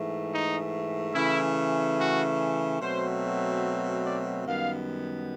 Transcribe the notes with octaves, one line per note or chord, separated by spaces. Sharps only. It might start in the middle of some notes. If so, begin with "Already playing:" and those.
Already playing: G#2 E3 A3
D#4
C#3 E3 A3 E4
F#4
B2 F#3 A3 C4 C5
D5
F#2 D#3 G3 B3 F5